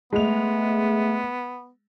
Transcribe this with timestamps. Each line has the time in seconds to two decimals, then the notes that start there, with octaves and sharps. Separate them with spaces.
0.13 G#3 A3 B3 F7